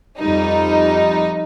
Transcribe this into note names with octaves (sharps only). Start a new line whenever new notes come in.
F2 G3 D#4